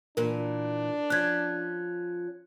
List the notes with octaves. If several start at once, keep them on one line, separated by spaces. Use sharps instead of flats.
A#2 E3 D4 A#4
F3 C#4 F#6 G#6